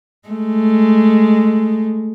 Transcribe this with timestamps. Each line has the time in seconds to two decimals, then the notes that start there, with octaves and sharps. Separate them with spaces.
0.29 G#3 A3